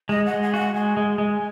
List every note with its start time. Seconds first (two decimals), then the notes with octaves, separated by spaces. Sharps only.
0.09 G#3 D#5
0.26 G#3 F#5
0.42 G#5
0.54 F#4 F5
0.58 F#5
0.74 G#3 G#5
0.97 G#3
1.18 G#3